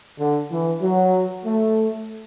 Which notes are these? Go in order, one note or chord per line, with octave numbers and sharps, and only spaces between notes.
D3
E3
F#3
A3